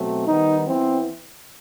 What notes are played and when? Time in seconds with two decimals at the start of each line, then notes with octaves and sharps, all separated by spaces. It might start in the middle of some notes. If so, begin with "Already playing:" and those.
Already playing: B2 F#3 A3 C4
0.26 D#3 G3 B3 D#4
0.67 E3 B3 C4